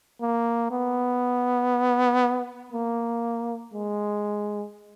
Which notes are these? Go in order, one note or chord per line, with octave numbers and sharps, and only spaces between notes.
A#3
B3
A#3
G#3